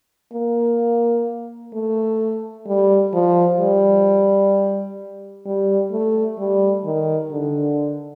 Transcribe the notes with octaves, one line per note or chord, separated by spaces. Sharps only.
A#3
A3
G3
F3
G3
G3
A3
G3
D#3
D3